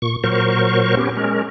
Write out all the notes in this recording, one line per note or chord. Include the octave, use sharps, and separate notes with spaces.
A#2 C#6
A#2 F#3 A#4 C5 C#6
B3 C#4 G4
G#3 C#4 A#4